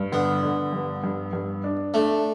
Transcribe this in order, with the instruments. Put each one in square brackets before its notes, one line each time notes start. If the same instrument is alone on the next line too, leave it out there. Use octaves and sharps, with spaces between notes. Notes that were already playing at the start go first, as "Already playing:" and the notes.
Already playing: [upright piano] G2
[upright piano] D3 [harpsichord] B3
[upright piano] D3
G2
G2
G2
D4
[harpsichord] A3 [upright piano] D4